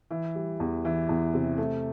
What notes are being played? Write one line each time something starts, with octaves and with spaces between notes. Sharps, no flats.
E3
G3
E2
E3
E2
C3
A3